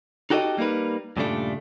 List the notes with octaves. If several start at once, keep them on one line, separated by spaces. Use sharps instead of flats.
D#4 F#4 G4 A4 C#5 D#5
G3 A#3 D#4 A#4 B4
G2 A#2 C#3 G3 A3 D4